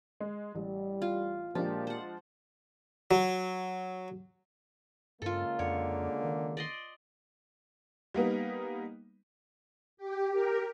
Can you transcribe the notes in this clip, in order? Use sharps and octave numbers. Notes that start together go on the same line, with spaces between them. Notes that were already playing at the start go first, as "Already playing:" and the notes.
G#3
A1 G3
F4
A#2 F3 G#3 D4 G4
C5 F#5
F#3
G2 C#3 G#3 A#3 F4 A4
F2 D3 C#5
D#3
D5 D#5 C6
G3 A#3 B3 D#4
G4
G4 A#4